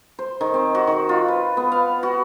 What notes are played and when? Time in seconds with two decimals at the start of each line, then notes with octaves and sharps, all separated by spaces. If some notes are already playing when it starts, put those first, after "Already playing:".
0.19 C5
0.41 D#3
0.54 C4
0.75 F#4
0.87 D#3
1.09 F4
1.28 B4
1.57 B3
1.72 F5
2.03 F#4